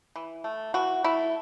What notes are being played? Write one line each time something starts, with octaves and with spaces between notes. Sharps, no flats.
E3
A3
E3 F#4
A3 E4